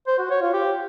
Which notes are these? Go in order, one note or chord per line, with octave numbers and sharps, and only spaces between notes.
C5
F#4
C#5
F4
G4